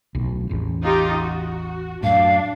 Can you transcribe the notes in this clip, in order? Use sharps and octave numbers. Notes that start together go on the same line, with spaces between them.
D1 B1
A1 E2
D#4 F4 G4
F#4
F#2 A2 D4 F5